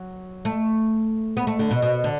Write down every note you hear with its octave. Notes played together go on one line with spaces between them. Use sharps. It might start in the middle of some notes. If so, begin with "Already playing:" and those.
Already playing: F#3
A3
B3
A3
D3
B2
B2
D3